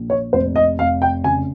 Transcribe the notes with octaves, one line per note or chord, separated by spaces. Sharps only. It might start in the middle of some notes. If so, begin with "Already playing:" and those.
Already playing: A#1
C#5
F1 C5
D#5
F1 F5
G5
C#3 G#5